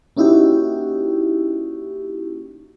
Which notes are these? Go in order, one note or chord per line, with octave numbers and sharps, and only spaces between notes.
A#3 C#4 D#4 E4 F#4 G4